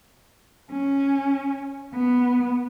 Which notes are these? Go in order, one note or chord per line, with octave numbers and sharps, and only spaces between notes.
C#4
B3